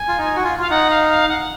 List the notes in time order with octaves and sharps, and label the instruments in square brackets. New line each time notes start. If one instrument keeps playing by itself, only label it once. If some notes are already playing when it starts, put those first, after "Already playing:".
Already playing: [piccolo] G#5
[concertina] F4
D#4
F#4
F4
[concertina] F4 [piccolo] F5
[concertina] D#4 [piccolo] F#5
[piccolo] F5
F5
F#5